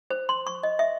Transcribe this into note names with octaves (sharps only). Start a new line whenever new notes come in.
C5
C6
C#6
D#5
E5